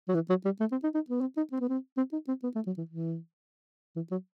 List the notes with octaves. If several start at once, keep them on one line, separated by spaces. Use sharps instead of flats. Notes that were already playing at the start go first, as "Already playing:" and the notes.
F#3
E3
F#3
G3
A3
C4
D#4
D#4
B3
C4
D#4
C4
B3
C4
C4
D#4
C4
B3
A3
F#3
E3
E3
E3
F#3